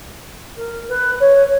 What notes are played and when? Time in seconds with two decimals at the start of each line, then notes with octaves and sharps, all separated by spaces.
0.56 A#4
0.88 B4
1.20 C#5